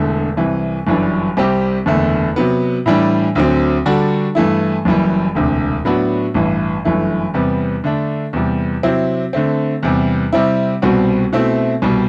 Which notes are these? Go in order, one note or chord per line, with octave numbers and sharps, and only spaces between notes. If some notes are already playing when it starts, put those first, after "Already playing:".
Already playing: E1 E2 D3 A3
C2 C3 E3
G1 F#2 E3 G3 D4
C2 C3 G3 C4 G4
F#1 E2 D3 A3
C3 F#3 B3
A2 E3 G3 D4
D2 D3 F#3 C4
D3 G3 D4 F#4 A4
G2 E3 A3 E4
F#1 F#2 E3 G3
E1 D2 C3
A2 F#3 B3 D4 F#4
A1 G2 E3
G1 F#2 E3 A3
E2 C3 G3 B3
D3 A3 D4
E2 C3 G3
C3 F#3 C4 E4
D3 A3 C4
E2 C3 G3
C3 G3 C4 E4
C2 B2 G3 C4 F#4
B2 A3 C4 E4
C2 B2 G3